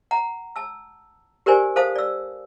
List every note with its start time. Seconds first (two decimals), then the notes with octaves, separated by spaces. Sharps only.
0.11 F#5 A#5
0.56 A5 E6
1.46 G4 A#4 C5 D5 G#5
1.76 A4 C5 F5 A5 D#6
1.96 D5 E6